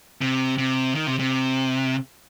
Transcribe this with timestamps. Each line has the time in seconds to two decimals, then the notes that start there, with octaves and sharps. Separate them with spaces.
0.21 C3
0.58 C3
0.95 D#3
1.07 C3
1.19 C3